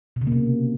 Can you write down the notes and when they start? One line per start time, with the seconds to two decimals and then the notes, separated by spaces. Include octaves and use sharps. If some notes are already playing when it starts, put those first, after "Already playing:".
0.16 B2
0.21 C#3
0.27 A#3
0.32 C3